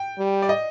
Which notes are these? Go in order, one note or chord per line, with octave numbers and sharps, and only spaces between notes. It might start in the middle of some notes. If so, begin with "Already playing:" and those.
Already playing: G5
G3
D5
D#5